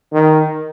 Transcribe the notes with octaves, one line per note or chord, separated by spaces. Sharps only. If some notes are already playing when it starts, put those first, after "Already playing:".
D#3